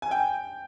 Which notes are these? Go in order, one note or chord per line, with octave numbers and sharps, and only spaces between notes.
G#5
G5